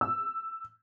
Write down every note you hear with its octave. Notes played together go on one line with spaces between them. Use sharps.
E6